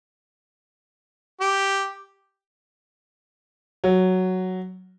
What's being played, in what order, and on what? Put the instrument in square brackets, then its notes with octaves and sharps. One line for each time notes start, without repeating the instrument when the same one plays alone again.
[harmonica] G4
[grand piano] F#3